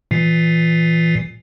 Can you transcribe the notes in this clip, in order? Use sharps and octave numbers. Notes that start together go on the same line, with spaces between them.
A#2 E3 C7